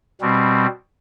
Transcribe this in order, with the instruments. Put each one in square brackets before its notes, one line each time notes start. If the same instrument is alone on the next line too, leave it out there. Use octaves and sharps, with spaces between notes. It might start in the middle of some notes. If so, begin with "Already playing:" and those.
[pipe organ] B2 G3 C4